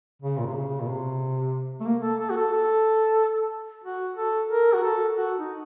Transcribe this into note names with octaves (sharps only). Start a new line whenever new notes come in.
C#3
A#2
C3
C#3
A#2
C3
A3
A#3
A4
A4
F#4
A4
A4
F#4
A4
A#4
F#4
A4
F#4
D#4